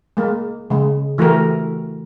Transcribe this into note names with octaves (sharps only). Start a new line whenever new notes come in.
G#3 A#3
C#3 G#3
E3 A3 F#4 G4 A#4